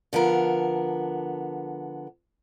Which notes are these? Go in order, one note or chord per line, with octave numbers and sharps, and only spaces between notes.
D3 F3 B3 A#4